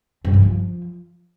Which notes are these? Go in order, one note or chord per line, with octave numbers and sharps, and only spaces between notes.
G2
E3
F3